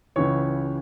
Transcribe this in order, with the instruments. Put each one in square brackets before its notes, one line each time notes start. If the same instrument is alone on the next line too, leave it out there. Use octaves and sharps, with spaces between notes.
[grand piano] C#2 C#3 E3 C#5 C#6